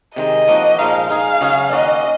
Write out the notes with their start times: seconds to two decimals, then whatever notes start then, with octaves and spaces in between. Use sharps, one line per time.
0.16 C3 D#3 G#3 D#5
0.48 F3 A#3 D#4 F#4
0.78 A#2 F3 G#3 D#4 F5
1.10 G#3 D#4 G#4 F5
1.41 C#3 F#3 C#4 G#4
1.72 D#3 A#3 C#4 F#4 D#5